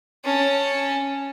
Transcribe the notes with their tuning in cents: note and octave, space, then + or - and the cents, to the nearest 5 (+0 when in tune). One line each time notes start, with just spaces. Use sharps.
C#4 +0 A5 +0